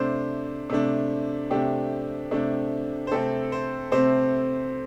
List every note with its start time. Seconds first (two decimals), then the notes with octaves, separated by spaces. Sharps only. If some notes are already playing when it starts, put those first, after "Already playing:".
Already playing: C3 A3 D4 C5
0.70 C3 A3 D4
1.50 C3 A3 D4 G4
2.31 C3 A3 D4
3.07 C5
3.11 C3 A3 C4 A4
3.52 C5
3.92 C3 A3 C4 C5